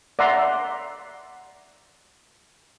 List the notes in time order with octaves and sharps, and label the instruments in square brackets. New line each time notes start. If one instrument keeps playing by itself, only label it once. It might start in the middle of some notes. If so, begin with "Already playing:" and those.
[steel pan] D5 E5 F#5 A#5 C6